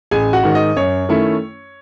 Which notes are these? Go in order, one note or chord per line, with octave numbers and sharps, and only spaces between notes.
A1 G#4 G#5
F#4 F#5
G#2 D#3
D#5
F#2 C#5
D#3 A3 C#4 E4